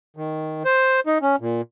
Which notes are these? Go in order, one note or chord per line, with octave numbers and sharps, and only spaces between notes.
D#3
C5
D#4
C#4
A#2